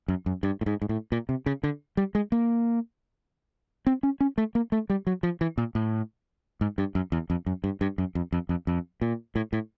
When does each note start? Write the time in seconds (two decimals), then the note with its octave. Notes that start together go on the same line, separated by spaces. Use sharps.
0.08 F#2
0.26 F#2
0.43 G2
0.61 A2
0.66 G#2
0.82 G#2
0.89 A2
1.12 A#2
1.29 C3
1.46 C#3
1.64 D3
1.97 G3
2.15 G#3
2.32 A#3
3.87 C4
4.03 C#4
4.21 C#4
4.38 A3
4.55 A#3
4.72 A3
4.90 G3
5.07 F#3
5.23 F3
5.41 E3
5.58 A#2
5.75 A2
6.61 G#2
6.78 G2
6.95 F#2
7.12 E2
7.30 F2
7.46 F#2
7.64 G2
7.81 G2
7.98 F#2
8.15 F2
8.33 F2
8.49 F2
8.67 F2
9.02 A#2
9.36 A2
9.53 A2